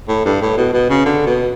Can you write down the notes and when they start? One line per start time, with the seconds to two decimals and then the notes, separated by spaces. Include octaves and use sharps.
0.08 A2
0.25 G2
0.41 A2
0.57 B2
0.73 B2
0.90 C#3
1.05 D3
1.26 B2